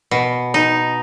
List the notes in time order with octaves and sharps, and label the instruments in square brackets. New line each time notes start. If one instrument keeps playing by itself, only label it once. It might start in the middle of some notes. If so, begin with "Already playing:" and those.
[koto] B2
D#4